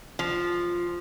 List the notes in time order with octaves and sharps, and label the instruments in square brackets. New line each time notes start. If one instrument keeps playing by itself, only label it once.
[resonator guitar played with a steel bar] F3